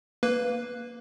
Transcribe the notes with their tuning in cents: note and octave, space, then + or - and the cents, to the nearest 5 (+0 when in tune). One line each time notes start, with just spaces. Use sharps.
A#3 +0 B4 +0